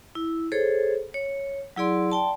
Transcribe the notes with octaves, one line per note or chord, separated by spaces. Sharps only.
E4
G#4 A4 C5 C#5
C#5
F#3 E4 G#4 D5 C6
D5 G5 A5 C6